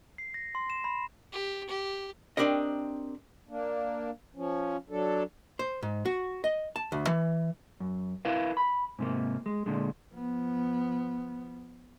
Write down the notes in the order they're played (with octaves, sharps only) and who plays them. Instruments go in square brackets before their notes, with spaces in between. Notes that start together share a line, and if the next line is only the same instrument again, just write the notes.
[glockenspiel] C7
A#6
C6
E7
B5
[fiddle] G4
G4
[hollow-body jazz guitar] C4 D4 G4 A#4 D#5
[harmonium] A#3 D4
F3 C#4
F#3 D4 A4
[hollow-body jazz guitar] C5
G#2
F#4
D#5
A5
D2
E3
[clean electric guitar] F#2
E4 A#4 B4 F5
B5
G#2 C3 A#3
G#3
A#2 D3 G#3
[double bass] F3 B3